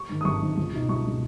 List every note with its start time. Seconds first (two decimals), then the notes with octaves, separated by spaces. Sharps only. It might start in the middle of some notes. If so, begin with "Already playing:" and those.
Already playing: C#6
0.09 G#2 D#3
0.21 D#6
0.25 G#1 C#6
0.41 G#2 D#3
0.57 C#2
0.73 B2 G#3 D#4
0.89 C#2 C#6
1.05 B2 G#3 D#4